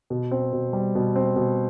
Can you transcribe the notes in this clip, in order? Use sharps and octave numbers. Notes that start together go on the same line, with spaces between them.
B2
C4
B2
G3
B2
C4
B2